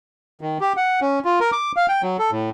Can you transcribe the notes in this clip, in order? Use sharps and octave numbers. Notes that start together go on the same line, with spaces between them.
D#3
G4
F#5
C#4
F4
A#4
D6
F5
G5
F#3
A4
A2